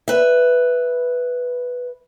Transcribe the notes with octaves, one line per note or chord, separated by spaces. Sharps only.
B4 E5